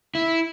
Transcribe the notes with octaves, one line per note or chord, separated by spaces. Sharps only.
E4